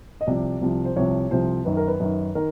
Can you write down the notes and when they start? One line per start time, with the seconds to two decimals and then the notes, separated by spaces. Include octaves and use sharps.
0.21 D#5
0.27 C2 C3 F3 D5
0.61 C2 C3 F3
0.85 C5
0.96 C2 C3 F3 C#5
1.31 C2 C3 F3 C5
1.65 F#2 D#3 B4
1.77 A#4
1.88 B4
2.00 F#2 D#3
2.35 D#3 A#4